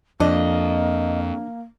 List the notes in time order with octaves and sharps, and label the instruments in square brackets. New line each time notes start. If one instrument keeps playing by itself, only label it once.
[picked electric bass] F2 [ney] A#3 [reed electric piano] D4 [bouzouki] D#5